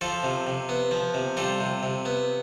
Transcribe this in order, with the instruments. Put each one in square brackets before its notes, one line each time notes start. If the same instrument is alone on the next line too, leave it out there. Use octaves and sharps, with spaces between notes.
[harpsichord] F3 F4 A4
C3
C3
B3
F3
C3
G3 F4 A4
C3
C3
B3